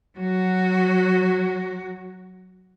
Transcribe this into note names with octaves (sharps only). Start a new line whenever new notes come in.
F#3 F#4